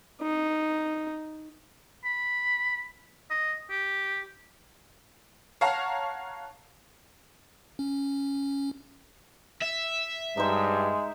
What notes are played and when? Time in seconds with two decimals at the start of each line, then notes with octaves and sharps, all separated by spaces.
0.22 D#4
2.04 B5
3.30 D#5
3.70 G4
5.61 C#5 F5 F#5 A5 A#5 C#6
7.79 C#4
9.62 E5
10.37 G2 G#3 D#4 C5